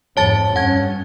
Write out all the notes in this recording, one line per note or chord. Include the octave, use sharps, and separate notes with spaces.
F2 G#2 C#5 A5 A6
G2 C#4 F#5 G#6